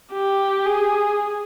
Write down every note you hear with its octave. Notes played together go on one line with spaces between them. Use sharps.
G4
G#4